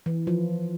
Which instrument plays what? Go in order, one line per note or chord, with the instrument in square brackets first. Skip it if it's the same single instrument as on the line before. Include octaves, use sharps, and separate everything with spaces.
[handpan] E3
F3